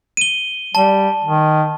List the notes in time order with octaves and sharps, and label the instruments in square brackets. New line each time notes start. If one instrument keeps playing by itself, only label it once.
[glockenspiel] D#7 G7
[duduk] G3 [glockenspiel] A5
[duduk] D#3